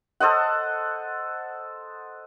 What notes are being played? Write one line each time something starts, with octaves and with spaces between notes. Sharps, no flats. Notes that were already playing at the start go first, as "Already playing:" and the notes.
A4 C5 D#5 F#5